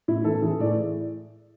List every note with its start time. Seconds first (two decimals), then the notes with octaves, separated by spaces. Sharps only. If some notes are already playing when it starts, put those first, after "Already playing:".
0.08 A2 E4
0.24 E3 A4
0.42 E3 G#4
0.60 A2 D5